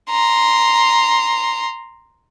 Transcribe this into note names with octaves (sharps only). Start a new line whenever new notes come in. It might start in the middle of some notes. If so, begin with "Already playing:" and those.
A#5 C6